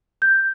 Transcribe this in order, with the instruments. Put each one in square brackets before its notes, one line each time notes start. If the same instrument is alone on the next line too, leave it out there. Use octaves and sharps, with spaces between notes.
[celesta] G6